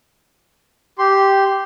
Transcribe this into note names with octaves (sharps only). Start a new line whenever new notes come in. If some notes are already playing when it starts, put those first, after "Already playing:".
G4 C6